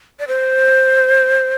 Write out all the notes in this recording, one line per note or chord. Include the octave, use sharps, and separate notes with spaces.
D5
C5